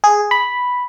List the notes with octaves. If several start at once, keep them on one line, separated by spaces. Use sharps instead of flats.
G#4
B5